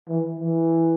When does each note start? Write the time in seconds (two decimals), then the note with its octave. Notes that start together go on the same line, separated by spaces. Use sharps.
0.08 E3
0.39 E3